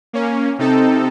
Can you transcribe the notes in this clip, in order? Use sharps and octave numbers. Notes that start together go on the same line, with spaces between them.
A#3 C#4
C3 C4 D#4 A4